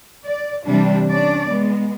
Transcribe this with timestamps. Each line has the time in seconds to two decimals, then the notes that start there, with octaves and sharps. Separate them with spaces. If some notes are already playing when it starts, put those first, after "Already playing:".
0.24 D5
0.66 C3 E3 G3 D4
1.09 C#4 D4 D5
1.49 G#3 B3